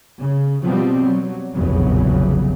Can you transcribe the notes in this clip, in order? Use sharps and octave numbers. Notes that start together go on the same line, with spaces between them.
C#3
B2 F3 G3 C4
F#3
F1 A#1 E2 C#3 F#3